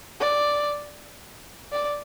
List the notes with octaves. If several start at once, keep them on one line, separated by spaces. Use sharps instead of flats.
D5
D5